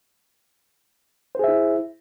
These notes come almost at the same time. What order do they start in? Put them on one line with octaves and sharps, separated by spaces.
C5 G#4 E5 E4